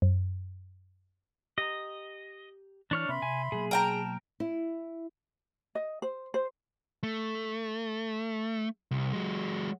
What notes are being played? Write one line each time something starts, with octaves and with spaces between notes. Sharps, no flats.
F#2
G4 D#5 A#5
E3 D4 E4 C#5 F6
C3 B3 C#4 E5 B5 C6
C3 G#5
B2 F#3 A#3 G#4
A#4 G5 A5 A#5
E4
D#5
C5
C5
A3
C2
F#3 G#3